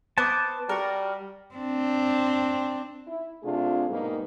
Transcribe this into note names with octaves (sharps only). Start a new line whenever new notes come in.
B3 C5 A5 D6
G3 F#4 A#4
C4 D4
E4
C3 A3 D4 F4 G#4
G#2 B2 G3 A#3 B3 D#4